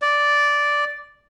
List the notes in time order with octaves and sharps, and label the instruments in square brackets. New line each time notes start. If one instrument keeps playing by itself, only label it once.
[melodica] D5